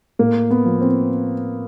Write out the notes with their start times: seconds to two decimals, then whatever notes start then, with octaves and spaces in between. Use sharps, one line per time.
0.19 A2 A#3
0.51 B3
0.65 F3
0.81 C4